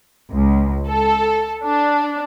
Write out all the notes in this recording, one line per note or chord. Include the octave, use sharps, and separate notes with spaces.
C#2
A4
D4